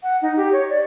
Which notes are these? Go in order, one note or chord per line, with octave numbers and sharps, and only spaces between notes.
F#5
D#4
G4
C#5
D5